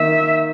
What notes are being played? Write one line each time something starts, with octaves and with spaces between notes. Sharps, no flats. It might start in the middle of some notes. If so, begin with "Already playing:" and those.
Already playing: D#3 A#3 D#4 A#4 E5